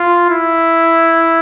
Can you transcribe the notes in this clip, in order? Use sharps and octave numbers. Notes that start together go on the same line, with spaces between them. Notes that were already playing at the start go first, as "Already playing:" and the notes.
Already playing: F4
E4